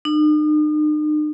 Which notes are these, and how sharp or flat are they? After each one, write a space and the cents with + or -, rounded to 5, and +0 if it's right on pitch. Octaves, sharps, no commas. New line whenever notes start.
D#4 -45